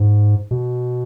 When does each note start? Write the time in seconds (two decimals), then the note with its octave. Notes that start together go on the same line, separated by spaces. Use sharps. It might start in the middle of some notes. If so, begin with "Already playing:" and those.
Already playing: G#2
0.51 B2